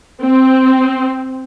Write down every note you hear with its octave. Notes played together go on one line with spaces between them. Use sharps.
C4